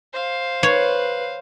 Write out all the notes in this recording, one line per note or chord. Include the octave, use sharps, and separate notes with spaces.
C5 F5
B4 C#5